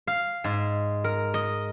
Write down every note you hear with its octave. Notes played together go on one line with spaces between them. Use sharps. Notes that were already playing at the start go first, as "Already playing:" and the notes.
F5
G#2
A#4
D#5